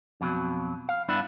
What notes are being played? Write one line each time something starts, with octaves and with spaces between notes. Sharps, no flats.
F2 B2 F3 F#3
F5
G2 B3 D4 E4